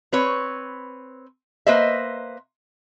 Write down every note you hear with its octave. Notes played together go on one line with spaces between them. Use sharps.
C4 B4 C#5
A#3 B4 C5 D#5 E5